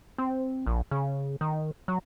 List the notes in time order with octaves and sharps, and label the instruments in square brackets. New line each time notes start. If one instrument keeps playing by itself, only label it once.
[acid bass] C4
A#1
C#3
D#3
F#3